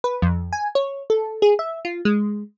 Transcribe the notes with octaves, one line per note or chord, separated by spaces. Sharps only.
B4
F2
G#5
C#5
A4
G#4
E5
F4
G#3